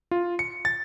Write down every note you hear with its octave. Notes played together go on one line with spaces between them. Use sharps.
F4
C#7
A6